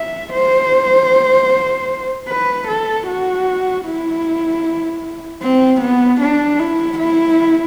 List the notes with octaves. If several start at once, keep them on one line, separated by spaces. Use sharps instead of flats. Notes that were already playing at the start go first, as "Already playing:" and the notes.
Already playing: E5
C5
B4
A4
F#4
E4
C4
B3
D4
E4
E4